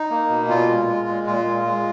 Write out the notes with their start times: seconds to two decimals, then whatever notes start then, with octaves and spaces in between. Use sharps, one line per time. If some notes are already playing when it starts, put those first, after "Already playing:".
Already playing: D#4
0.11 A#3
0.30 B2
0.49 A#2 F4
0.69 G#3
0.87 G#3
1.08 A#2
1.26 A#2 F4
1.47 G#3
1.66 G#3